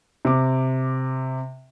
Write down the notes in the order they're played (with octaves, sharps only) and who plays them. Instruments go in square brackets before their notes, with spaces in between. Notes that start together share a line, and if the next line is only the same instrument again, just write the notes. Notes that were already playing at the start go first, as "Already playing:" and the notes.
[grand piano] C3 D6